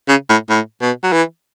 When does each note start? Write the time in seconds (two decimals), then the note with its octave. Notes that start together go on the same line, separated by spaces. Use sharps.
0.08 C#3
0.29 A2
0.50 A2
0.81 B2
1.03 F#3
1.13 E3